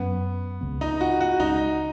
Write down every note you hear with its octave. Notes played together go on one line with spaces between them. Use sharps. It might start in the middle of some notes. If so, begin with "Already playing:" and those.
Already playing: F#2 F#3 B3 C#4
C#2 C#3 B3
D#4
F#4
F#4
C#2 C#3 G#3 C#4 D#4